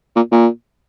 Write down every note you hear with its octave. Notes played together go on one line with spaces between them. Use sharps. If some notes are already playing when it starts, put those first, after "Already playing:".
A#2
A#2